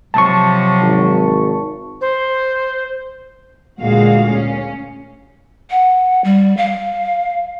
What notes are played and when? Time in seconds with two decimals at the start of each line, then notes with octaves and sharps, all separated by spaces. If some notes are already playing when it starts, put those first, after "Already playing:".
0.14 C3 F3 F#3 A5 C#6
0.81 G#1
2.01 C5
3.80 D2 A#2 G#3 F#4 G#4 F5
4.31 C#4
5.71 F#5
6.24 G3
6.57 F5